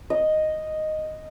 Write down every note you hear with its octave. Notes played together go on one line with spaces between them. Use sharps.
D#5